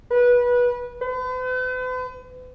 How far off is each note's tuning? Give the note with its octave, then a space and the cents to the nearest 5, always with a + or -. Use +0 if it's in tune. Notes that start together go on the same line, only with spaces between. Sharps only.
B4 -20
B4 +45